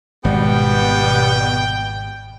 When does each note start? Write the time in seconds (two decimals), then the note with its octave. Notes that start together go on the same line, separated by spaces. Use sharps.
0.25 G#1 B2 G3 G#3 B3 G5